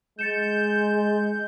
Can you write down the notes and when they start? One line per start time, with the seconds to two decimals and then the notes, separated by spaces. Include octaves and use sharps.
0.19 G#3 G6 A6 C#7 E7